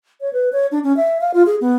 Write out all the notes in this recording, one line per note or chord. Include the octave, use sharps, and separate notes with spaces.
C#5
B4
C#5
D4
C#4
E5
F5
F4
G#4
B3